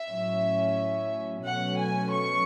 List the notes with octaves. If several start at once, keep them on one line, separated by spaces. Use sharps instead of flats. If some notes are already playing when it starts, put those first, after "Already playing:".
Already playing: E5
A2 F#3 C#4
B2 F#3 A3 C#4 F#5
G#5
C#6